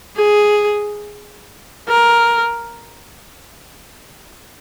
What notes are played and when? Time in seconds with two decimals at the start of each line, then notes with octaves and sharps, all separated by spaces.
0.16 G#4
1.88 A#4